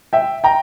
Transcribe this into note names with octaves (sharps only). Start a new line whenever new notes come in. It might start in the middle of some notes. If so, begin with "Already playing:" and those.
E5 G5
G5 A#5